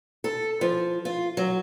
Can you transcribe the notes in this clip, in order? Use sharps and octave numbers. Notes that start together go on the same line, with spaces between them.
A4
F3
F4
F#3